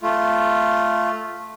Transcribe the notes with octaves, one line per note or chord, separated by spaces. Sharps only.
A3 F4